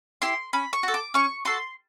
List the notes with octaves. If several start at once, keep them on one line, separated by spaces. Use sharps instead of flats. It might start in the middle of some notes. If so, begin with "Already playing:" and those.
E4 G4 C6
C#4 B5
C#6
F#4 A4
D6
C#4 C#6
F#4 A4 C6